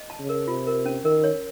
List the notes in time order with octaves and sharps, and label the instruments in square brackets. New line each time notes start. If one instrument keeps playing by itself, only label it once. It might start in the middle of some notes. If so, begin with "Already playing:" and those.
Already playing: [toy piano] D#5
A5
[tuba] C#3
[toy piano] A#4
[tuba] C3 [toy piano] F4
[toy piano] A#4
C#4
[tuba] D#3 [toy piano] A#4
[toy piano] C#5